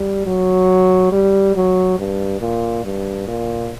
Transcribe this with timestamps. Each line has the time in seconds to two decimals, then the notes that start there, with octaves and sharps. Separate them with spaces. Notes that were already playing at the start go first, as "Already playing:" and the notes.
Already playing: G3
0.26 F#3
1.12 G3
1.56 F#3
1.99 G2
2.41 A#2
2.84 G2
3.28 A#2